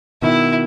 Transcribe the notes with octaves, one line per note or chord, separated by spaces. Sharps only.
B2 D#3 E4